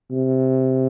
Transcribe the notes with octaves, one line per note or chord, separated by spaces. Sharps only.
C3